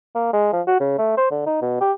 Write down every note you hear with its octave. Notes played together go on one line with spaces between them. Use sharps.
A#3
G#3
F3
F#4
C#3
A3
C5
D3
D#4
B2
G4